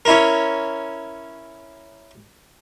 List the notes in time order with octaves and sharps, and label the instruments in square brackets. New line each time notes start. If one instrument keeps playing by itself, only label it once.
[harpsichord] C#4 E4 A#4